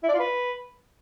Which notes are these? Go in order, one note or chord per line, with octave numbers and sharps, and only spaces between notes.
E4
D5
F4
B4